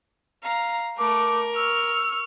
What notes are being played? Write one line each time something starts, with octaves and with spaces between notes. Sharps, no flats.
F5 A#5
A3 A#4 D6
C#6 E6 F6